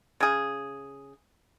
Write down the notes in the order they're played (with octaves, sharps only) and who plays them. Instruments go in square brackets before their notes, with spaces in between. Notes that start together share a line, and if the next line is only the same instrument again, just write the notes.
[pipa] C#3 G#4